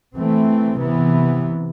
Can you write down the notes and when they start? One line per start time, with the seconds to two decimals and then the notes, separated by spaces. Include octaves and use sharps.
0.15 E3 A3 C4
0.80 C3 E3 B3